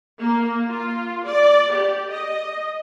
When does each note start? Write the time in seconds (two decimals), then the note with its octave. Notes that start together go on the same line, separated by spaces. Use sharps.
0.20 A#3
0.69 F4
1.25 D5
1.72 G4
2.11 D#5